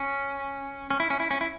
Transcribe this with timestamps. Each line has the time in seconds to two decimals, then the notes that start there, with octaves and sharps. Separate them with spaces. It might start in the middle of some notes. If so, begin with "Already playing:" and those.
Already playing: C#4
0.90 C#4
1.00 E4
1.10 C#4
1.20 E4
1.31 C#4
1.41 E4